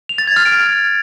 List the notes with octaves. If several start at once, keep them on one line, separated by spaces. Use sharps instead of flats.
F7
A6
G#6
F6
D7